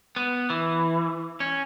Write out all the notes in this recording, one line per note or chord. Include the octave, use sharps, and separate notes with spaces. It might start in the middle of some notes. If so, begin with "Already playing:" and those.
B3
E3
C#4